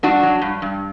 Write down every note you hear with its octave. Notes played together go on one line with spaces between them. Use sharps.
G2 D4 F#4
F#3
G2
G2